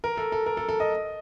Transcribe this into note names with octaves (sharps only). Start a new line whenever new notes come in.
A#4
A4
A4
A#4
A4
A4
D#5